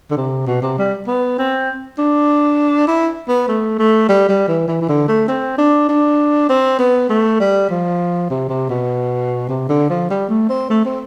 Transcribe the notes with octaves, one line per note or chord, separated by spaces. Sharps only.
D3
C3
B2
C3
G3
B3
C4
D4
E4
B3
A3
A3
G3
G3
E3
E3
E3
D3
A3
C4
D4
D4
C4
B3
A3
G3
F3
C3
C3
B2
C3
D3
F3
G3
A3
C4
A3
C4